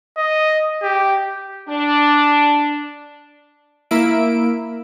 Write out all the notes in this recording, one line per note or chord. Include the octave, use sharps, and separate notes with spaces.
D#5
G4
D4
A#3 E4 E5 D7